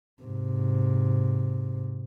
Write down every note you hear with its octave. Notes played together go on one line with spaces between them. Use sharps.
G#2 C3